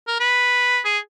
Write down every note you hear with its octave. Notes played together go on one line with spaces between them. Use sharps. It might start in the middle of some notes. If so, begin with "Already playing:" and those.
A#4
B4
G#4